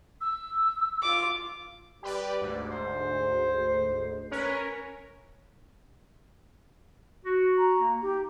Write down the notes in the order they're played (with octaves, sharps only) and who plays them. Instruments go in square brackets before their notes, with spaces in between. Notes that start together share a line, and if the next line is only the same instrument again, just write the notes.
[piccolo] E6
[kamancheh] F4 D6
[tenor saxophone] G3 [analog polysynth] G4 B4 D5
[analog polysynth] D2 G#2
[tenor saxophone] C5
[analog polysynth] C#4 A#4 C#5 [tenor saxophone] B4
[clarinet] F#4
[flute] A#5
[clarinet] A#3
[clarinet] D#4 [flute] G4